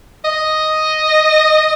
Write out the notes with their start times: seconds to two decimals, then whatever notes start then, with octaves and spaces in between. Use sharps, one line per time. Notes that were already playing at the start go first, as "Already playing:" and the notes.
0.24 D#5